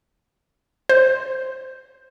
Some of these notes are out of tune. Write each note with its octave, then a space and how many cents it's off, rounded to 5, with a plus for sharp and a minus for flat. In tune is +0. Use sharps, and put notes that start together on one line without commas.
C5 +0